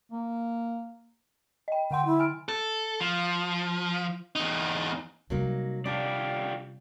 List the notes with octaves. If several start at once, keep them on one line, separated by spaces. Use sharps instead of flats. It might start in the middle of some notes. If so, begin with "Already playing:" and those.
A#3
D#5 G5
D3 F#5 G5 C6
E4
G#5 F6 D7
A4
F3
E2 D#4
C3 F#3 G3 A#3 D#4
D4 F4 G4 D5